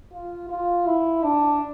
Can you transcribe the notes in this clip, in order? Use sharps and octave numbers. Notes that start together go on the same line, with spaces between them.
F4
F4
E4
D4